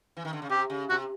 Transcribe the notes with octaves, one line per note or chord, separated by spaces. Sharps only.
E3
D#3
D3
C#3
C3 G4
C#3
C3 F#4